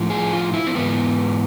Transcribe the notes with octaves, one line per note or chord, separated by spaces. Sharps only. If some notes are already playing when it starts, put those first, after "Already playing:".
Already playing: A2 F3
G#4
F4
E4
C4
G#2 E3 B3